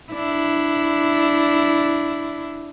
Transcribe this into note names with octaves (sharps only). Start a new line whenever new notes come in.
D4 E4